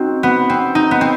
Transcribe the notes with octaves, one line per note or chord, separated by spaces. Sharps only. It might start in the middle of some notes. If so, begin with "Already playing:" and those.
Already playing: C4 D#4 F#4
B3
C4
D#4
B3
C4